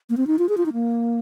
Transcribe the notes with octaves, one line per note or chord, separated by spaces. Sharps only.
A#3
C4
D#4
F4
G#4
F4
D#4
A#3